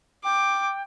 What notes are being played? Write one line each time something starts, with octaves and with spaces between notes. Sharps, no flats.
G5 D6